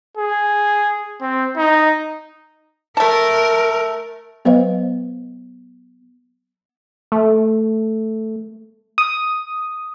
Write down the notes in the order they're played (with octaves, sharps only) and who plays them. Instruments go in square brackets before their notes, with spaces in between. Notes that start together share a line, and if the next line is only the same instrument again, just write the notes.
[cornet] G#4
C4
D#4
[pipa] A3 A5 [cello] A#4
[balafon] F#3 B3 B4 C5 D#5 F5
[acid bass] A3
[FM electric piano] D#6